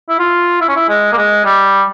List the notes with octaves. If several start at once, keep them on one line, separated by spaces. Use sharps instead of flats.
E4
F4
E4
C#4
E4
G#3
A#3
G#3
G3